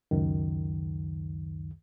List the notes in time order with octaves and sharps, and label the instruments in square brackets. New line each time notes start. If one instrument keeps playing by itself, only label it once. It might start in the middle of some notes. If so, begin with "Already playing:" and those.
[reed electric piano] C#2 F#2 D#3